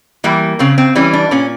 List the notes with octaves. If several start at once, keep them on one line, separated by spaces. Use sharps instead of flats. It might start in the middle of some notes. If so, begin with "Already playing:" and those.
E3 G3 A#3
C#3 C4
C4
E3 G3 C#4
D4
A#2 C#4